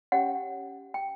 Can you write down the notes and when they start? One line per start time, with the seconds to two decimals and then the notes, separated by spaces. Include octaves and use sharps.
0.12 C#4 G4 C#5 F#5
0.94 G5